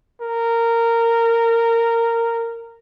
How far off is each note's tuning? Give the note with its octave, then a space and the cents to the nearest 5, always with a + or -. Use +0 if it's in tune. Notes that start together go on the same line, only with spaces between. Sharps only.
A#4 -15